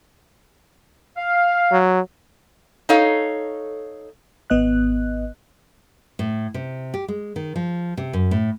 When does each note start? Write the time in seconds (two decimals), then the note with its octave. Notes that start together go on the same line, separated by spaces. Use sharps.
1.17 F5
1.71 F#3
2.89 D#4 A4 C#5 F5
4.50 G#1 B3 D#5 F#6
6.19 A2
6.54 C3
6.94 G4
7.08 G#3
7.36 D#3
7.56 F3
7.97 C3
8.13 F#2
8.31 A2